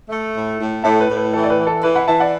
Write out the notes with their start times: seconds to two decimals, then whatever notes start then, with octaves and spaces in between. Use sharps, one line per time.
0.09 A3
0.35 A2
0.59 A2
0.84 A2 E5 A5
1.00 B4
1.09 A2
1.17 B4
1.33 E3 A4
1.44 D5
1.50 B4
1.58 E3
1.67 A4
1.83 E3 B4
1.95 F#5 B5
2.07 E3 E5 A5
2.20 D5 F#5